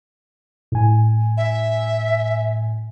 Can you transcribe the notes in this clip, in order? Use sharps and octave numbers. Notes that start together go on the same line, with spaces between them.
A2 G#5
E5